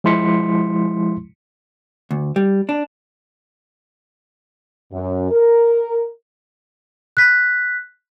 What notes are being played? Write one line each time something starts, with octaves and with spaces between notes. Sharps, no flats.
F3 G#3 E4 C6 B6 C#7
D2
G3
D4
F#2
A#4
F#6 B6